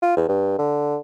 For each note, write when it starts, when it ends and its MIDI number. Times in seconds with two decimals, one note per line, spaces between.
0.02 0.13 65
0.16 0.26 40
0.29 0.57 43
0.58 0.98 50